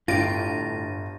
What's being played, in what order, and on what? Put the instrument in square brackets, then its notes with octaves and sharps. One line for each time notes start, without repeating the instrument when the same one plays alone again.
[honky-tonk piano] G1 D7 [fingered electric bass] A2 [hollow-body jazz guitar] F4 G4 [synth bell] A6 A#6 D#7